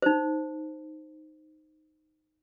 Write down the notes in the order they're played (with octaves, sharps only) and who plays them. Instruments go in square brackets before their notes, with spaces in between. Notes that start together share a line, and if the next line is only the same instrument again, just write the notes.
[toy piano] D#4 C5